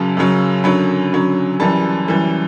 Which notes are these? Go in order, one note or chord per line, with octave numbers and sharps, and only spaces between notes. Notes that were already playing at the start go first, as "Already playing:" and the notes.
Already playing: F#2 C#3 F#3 A5
F#2 C#3 F#3
F#2 D3 F#3 B5
F#2 D3 F#3
F#2 E3 G3 A5
F#2 E3 G3